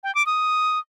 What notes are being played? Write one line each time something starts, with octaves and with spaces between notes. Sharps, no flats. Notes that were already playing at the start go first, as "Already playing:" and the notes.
G5
D6
D#6